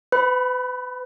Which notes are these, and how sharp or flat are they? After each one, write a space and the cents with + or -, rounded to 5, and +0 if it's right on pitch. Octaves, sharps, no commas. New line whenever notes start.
B4 +35 B5 +0